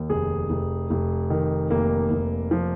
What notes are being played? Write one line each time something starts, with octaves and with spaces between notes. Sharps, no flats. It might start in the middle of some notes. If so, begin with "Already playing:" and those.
Already playing: D#2
F1 G#4
F1
F1
D#3
F1 A#3
F1
F3